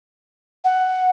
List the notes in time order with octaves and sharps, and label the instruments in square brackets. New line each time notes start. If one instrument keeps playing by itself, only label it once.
[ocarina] F#5